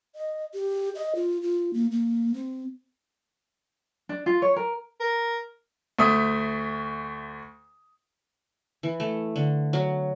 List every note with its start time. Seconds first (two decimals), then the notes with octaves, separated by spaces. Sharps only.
0.15 D#5
0.54 G4
0.95 D#5
1.15 F4
1.42 F4
1.74 A#3
1.91 A#3
2.34 C4
4.09 D4
4.26 F4
4.42 C#5
4.56 A#4
5.00 A#4
5.99 D2 A3 E5 D#6
8.83 E3
9.00 A3
9.36 D3
9.73 F#3